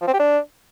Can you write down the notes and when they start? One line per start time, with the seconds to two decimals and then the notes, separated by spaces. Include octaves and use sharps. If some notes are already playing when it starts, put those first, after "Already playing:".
0.02 F3
0.07 C4
0.13 G4
0.19 D4